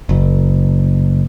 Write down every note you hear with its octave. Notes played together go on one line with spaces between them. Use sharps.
F#1